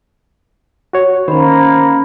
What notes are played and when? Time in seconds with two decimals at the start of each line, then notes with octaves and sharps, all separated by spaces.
0.93 F#4 C#5
1.28 D#3 A#3 C#4 C5 B5